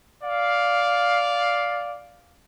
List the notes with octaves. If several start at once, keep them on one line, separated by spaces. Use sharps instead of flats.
D5 F5